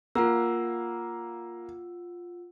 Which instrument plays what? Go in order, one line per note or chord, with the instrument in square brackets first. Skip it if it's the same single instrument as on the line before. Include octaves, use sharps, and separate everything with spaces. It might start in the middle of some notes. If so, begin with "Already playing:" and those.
[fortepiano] A#3 [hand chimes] F4 F#5 E6